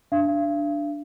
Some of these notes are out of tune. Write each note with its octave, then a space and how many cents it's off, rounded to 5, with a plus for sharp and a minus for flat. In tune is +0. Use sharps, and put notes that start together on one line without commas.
D4 +0 F5 -45